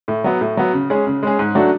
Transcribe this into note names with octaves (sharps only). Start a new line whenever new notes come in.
A2
F#3 B3
A2
F#3 B3
C#3
G#3 C#4 G#4
C#3
G#3 C#4 G#4
G#2
F#3 A3 D4 F#4